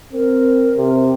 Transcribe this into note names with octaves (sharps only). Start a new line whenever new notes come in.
C4 A#4
C3